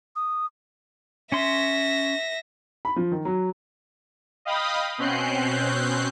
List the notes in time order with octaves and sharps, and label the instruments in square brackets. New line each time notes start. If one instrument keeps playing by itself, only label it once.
[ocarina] D#6
[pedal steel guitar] C#4 C6 [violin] E5 A#6
[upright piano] B5
F3
D#3
F#3
[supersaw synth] D#5 F5 G5 B5 D#6
B2 C4 C#4 F#6 G6 C7